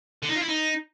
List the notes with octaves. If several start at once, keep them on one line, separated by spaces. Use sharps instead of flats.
D3
D#4
F4
E4
D#4